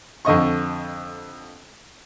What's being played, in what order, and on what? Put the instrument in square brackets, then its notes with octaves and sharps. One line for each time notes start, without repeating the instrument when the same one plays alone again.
[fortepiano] F2 D3 D#5 C#6